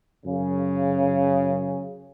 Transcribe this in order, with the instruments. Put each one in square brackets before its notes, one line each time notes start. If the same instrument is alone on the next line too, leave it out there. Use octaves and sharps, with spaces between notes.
[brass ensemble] F#2 C#3